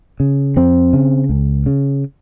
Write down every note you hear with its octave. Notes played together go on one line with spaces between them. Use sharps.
C#3
F2 C4
C#3
C#2
C#3